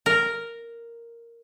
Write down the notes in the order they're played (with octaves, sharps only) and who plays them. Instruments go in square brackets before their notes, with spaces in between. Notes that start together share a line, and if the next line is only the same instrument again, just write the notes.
[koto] A#4